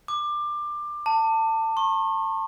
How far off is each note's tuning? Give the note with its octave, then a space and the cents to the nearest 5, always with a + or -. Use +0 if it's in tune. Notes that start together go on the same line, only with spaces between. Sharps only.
D6 +20
A5 +25
C#6 -40